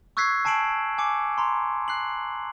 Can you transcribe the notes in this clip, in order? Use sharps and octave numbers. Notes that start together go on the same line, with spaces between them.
C#6 E6 F#6 G#6 B6 C7
G#5 A5 C7 D7 E7 F#7
G#5 D6 C#7
A#5 C6
F#6 C7 F#7